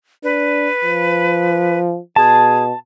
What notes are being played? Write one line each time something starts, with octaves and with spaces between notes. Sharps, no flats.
D4 B4
F3
B2 G#4 A5